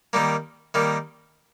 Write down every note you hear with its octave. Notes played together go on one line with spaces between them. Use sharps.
D#3 G3 A#3
D#3 G3 A#3